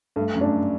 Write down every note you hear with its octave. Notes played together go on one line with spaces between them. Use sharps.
G2 A3
F#2
D4